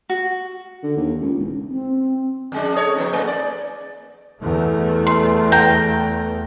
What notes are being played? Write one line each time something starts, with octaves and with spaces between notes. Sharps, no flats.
F#4
D3
D#2
C#2
E1
C4
F2 G#3 D4
A4 C#5 D#5
F3 B3 D#4
G#2 A3 A#3
D5
E2 A3
C6
G5 A#5